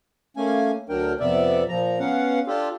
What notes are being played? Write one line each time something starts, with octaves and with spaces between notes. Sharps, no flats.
A3 A#3 C#4 G#5
D2 F#3 D4 A#4 G5
F2 C3 B3 D5 E5
A#2 F3 A#5
B3 C#4 F5 F#5
D4 F4 G4 A4